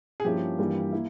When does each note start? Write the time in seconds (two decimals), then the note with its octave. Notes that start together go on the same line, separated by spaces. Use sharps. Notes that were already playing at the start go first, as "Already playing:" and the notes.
0.20 G#4
0.24 G2 F3 A#3 C#4 E4 G4
0.59 G2 E3 G3 A#3 F4
0.92 A#3 E4